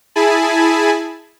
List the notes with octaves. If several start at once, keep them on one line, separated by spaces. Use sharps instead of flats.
E4 G#4 G#5 A5 B5